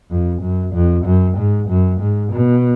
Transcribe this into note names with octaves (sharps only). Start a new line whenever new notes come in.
F2
F#2
F2
F#2
G#2
F#2
G#2
B2